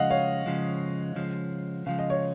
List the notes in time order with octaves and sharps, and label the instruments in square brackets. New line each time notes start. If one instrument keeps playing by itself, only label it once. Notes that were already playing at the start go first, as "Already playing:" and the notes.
Already playing: [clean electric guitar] C#3 F3 G#3 [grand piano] D#5 F5 F#5
[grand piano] C#5 F5
[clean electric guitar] C#3 F3 G#3
C#3 F3 G#3
[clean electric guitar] C#3 F3 G#3 [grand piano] F5
[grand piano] D#5
C#5